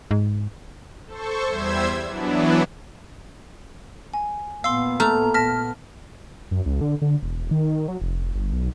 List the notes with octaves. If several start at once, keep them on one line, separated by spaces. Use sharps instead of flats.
G#2
A4 C5 C#6
E2 G3 C5 E5 E6 G#6
E3 F#3 B3 D4 E4
G#5
A#2 B3 F5 C6 E6
A3 A#5 F6
A5 F6 A#6 B6
F#2
C#2
D3
D3
E1
D#3
F#3
F1
G1
B1